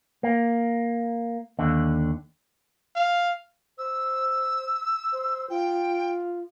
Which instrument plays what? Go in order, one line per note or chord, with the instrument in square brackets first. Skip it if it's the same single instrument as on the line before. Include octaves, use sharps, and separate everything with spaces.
[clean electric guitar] A#3
D#2 D3
[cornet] F5
[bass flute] C5 [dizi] E6
[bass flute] C5
[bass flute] F4 [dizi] G5